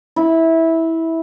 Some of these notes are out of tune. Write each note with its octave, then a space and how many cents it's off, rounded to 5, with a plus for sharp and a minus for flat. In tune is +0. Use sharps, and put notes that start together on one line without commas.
E4 -15